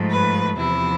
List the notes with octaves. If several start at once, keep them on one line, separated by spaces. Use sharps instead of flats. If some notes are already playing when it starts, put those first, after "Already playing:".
Already playing: G#2 F3 A3
B4
E2 C3 F3 E4